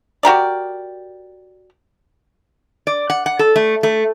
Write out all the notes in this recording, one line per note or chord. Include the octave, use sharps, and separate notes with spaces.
F#4 G4 A#4 D5
D5
F#5
F#5
A4
A3
A3